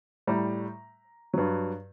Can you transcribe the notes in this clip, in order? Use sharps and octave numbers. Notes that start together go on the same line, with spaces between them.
A2 G3 A#5
G2 F#3